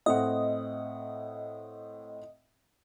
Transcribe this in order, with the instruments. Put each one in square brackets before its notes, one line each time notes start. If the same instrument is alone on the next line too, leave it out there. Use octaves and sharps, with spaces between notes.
[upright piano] A2 C4 F#5 [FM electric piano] D#5